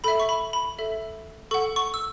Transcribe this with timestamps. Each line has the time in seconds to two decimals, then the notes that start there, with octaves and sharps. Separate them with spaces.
0.04 A4 E5 B5
0.20 C#6
0.29 B5
0.53 B5
0.79 A4 E5
1.51 A4 F#5 C#6
1.76 C#6
1.94 E6